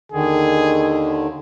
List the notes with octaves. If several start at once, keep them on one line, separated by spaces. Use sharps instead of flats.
D#2 D3 D#3 G#4